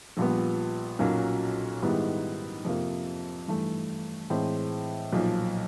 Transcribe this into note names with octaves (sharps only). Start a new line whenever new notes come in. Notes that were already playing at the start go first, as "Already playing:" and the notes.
A#1 A#2 G3 B3
B1 A#2 F#3 A#3 C#4
G#2 D#3 G3 B3 E4
F2 C3 F3 A#3
G2 E3 A3
A2 E3 G#3 C4
B1 A#2 F3